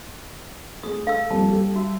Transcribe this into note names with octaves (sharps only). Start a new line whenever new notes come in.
A3 G#4 D#6
A4 F5 E6
D#1 F2 G3 A5
G4
F#4 E5